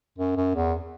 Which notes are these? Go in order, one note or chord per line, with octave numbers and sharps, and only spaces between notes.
F#2
F#2
E2